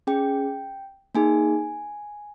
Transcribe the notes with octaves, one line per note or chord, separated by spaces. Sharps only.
C#4 G#4 G5
A#3 D#4 G#4 G#5